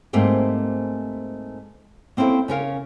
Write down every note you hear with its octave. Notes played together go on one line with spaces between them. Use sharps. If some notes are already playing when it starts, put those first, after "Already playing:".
G#2 A3 A#3 C4 G4
A#3 C4 C#4 E4 A4 C5
C#3 C#4 A#4 F5